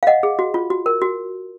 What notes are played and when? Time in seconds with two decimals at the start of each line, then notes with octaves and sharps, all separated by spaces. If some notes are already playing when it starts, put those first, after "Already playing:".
0.03 F5
0.07 D#5 F#5
0.23 G#4
0.39 F#4
0.54 F4
0.70 F#4
0.86 A#4
1.02 F#4